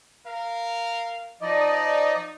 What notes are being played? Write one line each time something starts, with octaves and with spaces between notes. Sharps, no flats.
A#4 F5
F3 D#4 D5 D#5